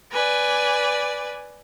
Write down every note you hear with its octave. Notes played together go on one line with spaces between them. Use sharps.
B4 D5 G#5